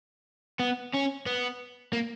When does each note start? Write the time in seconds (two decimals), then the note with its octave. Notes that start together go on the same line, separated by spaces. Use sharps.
0.59 B3
0.94 C#4
1.26 B3
1.93 A#3